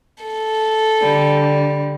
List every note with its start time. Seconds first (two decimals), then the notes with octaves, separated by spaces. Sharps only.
0.24 A4
1.00 D3 G3